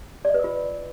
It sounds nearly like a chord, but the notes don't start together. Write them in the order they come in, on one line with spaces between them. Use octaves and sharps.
D5 D#5 B4 A#4 F4